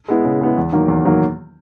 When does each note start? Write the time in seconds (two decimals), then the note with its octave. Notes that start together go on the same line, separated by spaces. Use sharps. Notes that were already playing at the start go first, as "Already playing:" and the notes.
0.08 G#3 B3 E4
0.25 C#3
0.41 G#3 B3 E4
0.57 E2
0.73 D#3 F#3 A#3
0.88 E2
1.05 D#3 F#3 A#3